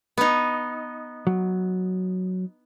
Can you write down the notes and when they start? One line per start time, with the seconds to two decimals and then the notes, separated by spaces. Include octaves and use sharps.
0.18 B3 D#4
1.27 F#3